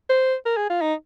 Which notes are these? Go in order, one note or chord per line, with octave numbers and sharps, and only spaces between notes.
C5
A#4
G#4
F4
D#4